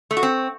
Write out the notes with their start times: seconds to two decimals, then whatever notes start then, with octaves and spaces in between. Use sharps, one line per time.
0.11 A3
0.17 F#4
0.23 C4